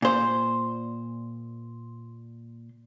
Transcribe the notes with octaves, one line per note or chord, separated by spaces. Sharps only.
A#2 C5